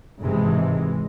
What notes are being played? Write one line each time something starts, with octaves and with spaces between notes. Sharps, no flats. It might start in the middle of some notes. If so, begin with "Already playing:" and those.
G#1 C3 E3 G#3